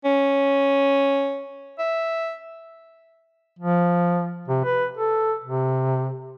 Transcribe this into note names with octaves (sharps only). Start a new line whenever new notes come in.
C#4
E5
F3
C3
B4
A4
C3